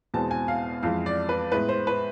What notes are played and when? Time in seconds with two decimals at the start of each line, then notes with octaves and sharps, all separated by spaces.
0.14 E2 B2 G#3 C4 A5
0.31 G#5
0.48 F5
0.83 F2 E3 G#3 F5
1.06 D5
1.29 B4
1.52 A2 G#3 B3 B4
1.69 C5
1.87 B4